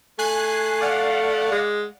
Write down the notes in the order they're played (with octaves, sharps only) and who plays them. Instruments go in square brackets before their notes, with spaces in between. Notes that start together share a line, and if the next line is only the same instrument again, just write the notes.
[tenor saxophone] A3 [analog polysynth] G#5 F#6 C7
[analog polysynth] D5 F5 F#5
[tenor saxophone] G#3